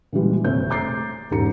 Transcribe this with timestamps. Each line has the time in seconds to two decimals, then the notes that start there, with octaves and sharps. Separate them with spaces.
0.12 A#2 E3 G3 G#3
0.44 F1 A3 C4 C5 C#5 G6
0.70 A#5 D6 G6 A6 C7
1.31 E1 G#2 C#4 G4 A#5 C#7